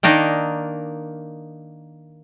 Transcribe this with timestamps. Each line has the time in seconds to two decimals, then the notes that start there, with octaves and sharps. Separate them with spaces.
0.03 D#3 A#3 D4 D#4